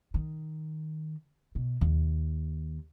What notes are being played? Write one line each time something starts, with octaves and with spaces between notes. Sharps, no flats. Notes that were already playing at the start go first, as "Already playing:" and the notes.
D#3
B2
D#2